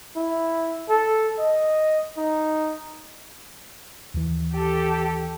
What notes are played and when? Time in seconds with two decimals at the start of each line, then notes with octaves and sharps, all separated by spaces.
0.16 E4
0.90 A4
1.39 D#5
2.18 D#4
4.14 D#2 E3
4.53 G4 A4